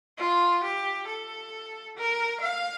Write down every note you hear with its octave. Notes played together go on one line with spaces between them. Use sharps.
F4
G4
A4
A#4
F5